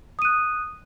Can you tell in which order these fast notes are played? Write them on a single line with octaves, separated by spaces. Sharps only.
D#6 D#7 F#6